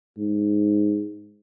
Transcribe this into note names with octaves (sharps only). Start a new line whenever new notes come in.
G#2